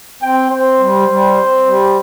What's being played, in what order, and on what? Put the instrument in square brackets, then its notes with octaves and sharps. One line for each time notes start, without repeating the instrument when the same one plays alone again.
[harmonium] C4 [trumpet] G5
[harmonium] C4 [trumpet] C5
[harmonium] G3
G3
C4
G3